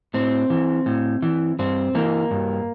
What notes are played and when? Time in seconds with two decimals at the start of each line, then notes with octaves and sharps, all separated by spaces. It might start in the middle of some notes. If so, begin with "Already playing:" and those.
0.14 A2 C4
0.50 E3
0.86 A2
1.22 E3
1.59 G2 C4
1.95 E3 A#3
2.31 G2